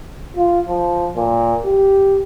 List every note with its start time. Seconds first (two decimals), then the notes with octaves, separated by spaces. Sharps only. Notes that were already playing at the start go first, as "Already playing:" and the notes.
0.36 F4
0.68 F3
1.16 A#2
1.65 G4